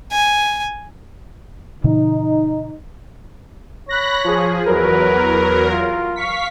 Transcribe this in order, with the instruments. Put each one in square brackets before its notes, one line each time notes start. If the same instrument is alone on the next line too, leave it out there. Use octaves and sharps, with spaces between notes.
[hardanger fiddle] G#5
[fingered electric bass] A#2 C#3 E3 [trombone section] D#4
[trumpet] C#5 [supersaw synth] B5 F#6 A#6
[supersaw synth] F3 G#4
[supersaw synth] E2 F#3 A#4 [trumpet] B4
[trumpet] F4
[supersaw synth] F5 C#6 B6